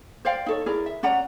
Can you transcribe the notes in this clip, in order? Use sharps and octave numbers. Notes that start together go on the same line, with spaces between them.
C5 D5 F5 G5
D#4 A4 C#5
E4 G#4 A#4 D5
E5
C#4 D5 F#5 A#5